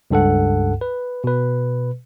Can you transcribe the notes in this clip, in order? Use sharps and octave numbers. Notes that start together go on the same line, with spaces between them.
C#2 G2 A4 F#5
B4
B2 B4